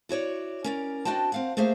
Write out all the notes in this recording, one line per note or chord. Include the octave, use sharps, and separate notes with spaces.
E4 F#4 C#5 D5
C#4 A#4 D5
C4 D4 F#4 D#5 G5 A5
C4 F5 F#5
A3 A#3 G#4 C5 E5 F5